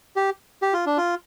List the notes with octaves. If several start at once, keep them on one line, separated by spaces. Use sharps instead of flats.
G4
G4
F4
D4
F4